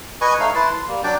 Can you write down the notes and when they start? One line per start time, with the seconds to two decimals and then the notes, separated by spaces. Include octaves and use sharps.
0.21 B4 D#5 G#5 C#6
0.39 A3 D#4 C#5 F5
0.55 E4 B4 A5 C6
0.73 C6
0.88 G3 A#3
1.04 F#3 D4 D5 G5